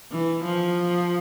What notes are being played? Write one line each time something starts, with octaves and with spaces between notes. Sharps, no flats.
E3
F3